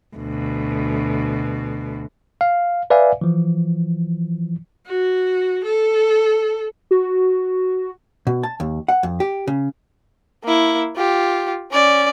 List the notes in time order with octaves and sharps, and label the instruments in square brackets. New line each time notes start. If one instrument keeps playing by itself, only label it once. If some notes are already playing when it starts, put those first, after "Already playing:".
[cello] D2 B2
[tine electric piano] F5
B4 D5 E5 F5 G#5
E3 F3
[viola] F#4
A4
[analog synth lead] F#4
[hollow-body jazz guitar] B2
A5
D#2
F#5
F2
G4
C#3
[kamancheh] A#3 E4
F4 G4
C#4 D5